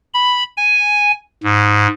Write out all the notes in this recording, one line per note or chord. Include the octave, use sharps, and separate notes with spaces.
B5
G#5
G#2